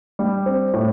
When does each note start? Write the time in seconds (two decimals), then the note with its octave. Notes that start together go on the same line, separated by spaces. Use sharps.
0.19 G3
0.46 C4
0.73 A2